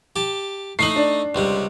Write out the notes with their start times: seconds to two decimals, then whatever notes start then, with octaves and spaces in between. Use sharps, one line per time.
0.16 G4 A5
0.79 A3 D#4 D#5 C7 F#7
0.96 D4
1.35 C#2 C3 G3